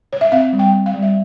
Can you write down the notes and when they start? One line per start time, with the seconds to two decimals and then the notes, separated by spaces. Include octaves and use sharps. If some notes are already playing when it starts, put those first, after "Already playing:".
0.13 C#5
0.21 E5
0.32 C4 F5
0.53 G3
0.59 G5
0.73 C4
0.86 F5
0.94 G3
1.02 E5